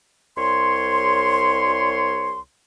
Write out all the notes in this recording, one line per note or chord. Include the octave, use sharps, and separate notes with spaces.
C2 C#5 C6